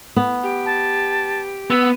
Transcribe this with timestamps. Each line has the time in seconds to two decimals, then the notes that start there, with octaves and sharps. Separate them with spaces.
0.16 B3
0.43 G4
0.66 A5
1.70 B3 E6